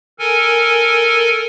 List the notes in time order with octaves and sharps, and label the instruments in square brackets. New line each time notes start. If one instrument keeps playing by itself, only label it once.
[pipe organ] A4 A#4 G#5